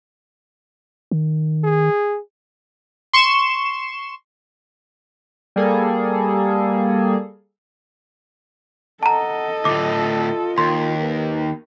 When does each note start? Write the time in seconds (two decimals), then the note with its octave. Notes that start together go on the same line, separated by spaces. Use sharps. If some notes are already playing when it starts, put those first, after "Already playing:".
1.11 D#3
1.64 G#4
3.13 C6 C#6 E7
5.56 G3 A#3 G#4 A4
9.03 A4 D#5 F#5 A5 A#5
9.65 D2 A2 F4 D6
10.58 D#2 A#4 C6
11.01 B4